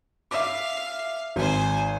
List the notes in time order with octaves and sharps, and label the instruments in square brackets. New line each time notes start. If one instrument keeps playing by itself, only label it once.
[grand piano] E5 D6 [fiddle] F5
[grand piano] G#1 [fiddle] C5 G#5